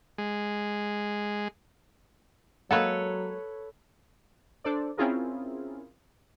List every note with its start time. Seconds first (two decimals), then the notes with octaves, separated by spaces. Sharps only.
0.18 G#3
2.71 F#3 G#3 A#3 A4 B4 C#5 F#5
4.64 D4 A4 C5 D5
4.97 C4 C#4 E4 F4 G#4 A#4